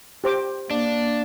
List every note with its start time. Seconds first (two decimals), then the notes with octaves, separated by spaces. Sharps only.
0.24 G4 C5 D6
0.71 A#3 D4